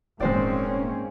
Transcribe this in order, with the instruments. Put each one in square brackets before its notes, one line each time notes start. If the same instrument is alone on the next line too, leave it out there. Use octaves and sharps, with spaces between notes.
[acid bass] D#1 [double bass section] G#2 A#3 C#4 [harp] G#3 C5 D5 [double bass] C4